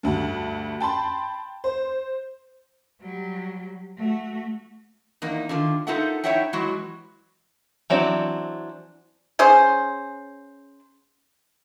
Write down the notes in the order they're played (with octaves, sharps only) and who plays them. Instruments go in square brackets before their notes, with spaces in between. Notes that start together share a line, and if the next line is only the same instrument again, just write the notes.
[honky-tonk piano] D2 G2
G5 A5 B5 C6
C5
[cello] F#3 G3
A3 F#4
[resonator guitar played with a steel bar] E2 A#3 D#4
D3 D#3 F4
D#4 F4 A4 A#4 E5 F#5
D#4 E4 C#5 E5 F#5 G5
E3 F#3 G#3 E4 F#4
[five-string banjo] E3 F#3 C4 D4
[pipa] C#4 G#4 C5